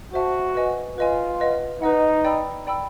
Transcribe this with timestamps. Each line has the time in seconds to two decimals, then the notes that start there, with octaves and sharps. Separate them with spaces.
0.13 F#4 C5 E5 A5
0.55 B4 D#5 G#5
0.97 F4 B4 D#5 G#5
1.40 B4 D#5 F#5
1.82 D#4 B4 D#5 F#5
2.25 D5 G5 B5 E6
2.67 D5 G5 B5 E6